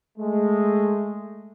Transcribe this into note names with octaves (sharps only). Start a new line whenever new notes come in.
G#3 A3